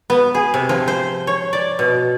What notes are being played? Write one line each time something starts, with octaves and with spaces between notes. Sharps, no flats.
B3
G#4
C3
F3
C5
C#5
D5
B2